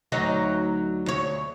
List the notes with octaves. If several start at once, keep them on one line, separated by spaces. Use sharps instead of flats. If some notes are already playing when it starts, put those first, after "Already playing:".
D2 F#3 D#4
D2 C#5